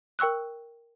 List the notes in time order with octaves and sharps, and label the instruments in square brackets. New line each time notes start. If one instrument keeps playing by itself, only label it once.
[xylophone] A#4 G5 C#6 E6 F#6